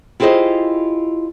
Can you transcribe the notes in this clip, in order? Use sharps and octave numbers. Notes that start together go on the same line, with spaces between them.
E4 F4 G4 G#4 C5 D#5